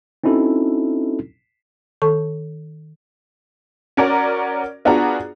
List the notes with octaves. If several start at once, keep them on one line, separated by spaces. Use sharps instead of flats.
C4 C#4 D#4 E4 F#4 A4
D#3 A4 A5 C#6
C#4 F#4 A#4 D5 A#5
B3 D4 F4 F#4 G#4 A#5